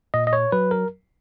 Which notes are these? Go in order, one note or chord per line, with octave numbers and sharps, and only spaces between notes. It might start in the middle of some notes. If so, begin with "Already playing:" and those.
A#2 D#5
D#5
C#5
F#3 B4
A#4